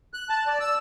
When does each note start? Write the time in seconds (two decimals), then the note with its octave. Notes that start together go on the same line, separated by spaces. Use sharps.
0.14 F#6
0.30 A5
0.47 D5
0.60 E6